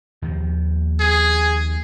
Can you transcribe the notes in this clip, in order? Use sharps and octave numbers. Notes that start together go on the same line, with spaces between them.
D#2 D#3 F3
G#4